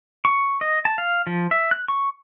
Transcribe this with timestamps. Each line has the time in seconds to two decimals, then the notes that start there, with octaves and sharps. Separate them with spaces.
0.25 C#6
0.61 D#5
0.85 A5
0.98 F5
1.27 F3
1.51 E5
1.71 F#6
1.88 C#6